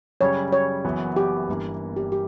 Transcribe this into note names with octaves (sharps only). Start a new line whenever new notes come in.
F#2 C#3 G3 C#5
C#5
F#1 F#2 E3 B3 F#4
G4
G1 G2 E3 A#3
G4
G4